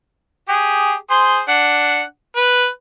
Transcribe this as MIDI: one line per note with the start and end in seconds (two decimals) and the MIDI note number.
0.49 0.94 67
0.49 0.94 68
1.10 1.41 68
1.10 1.41 72
1.10 1.41 84
1.48 2.02 62
1.48 2.02 78
2.36 2.67 71